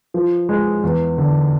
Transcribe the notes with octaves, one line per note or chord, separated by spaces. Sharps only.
F3
G#3
E2
D3